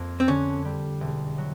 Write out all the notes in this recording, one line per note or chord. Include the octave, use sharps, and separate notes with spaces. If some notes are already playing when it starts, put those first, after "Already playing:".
Already playing: F2 A#3
C4
D3 C#4
G3
E1
F#3